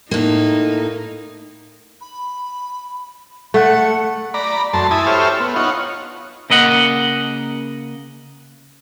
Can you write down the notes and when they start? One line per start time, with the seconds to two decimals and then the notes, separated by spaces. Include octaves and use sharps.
0.11 A2 A#3 D#4
2.01 B5
3.54 A3 F#5
4.34 D5 A#5 B5
4.73 F#2 A3 A5 C6
4.91 E4 G#5 A5 B5 D#6
5.06 G4 A4 C5 C#5 E5 F6
5.40 B3
5.56 D#4 F4 C#5 F#5
6.50 C#3 A#3 D#5 F#5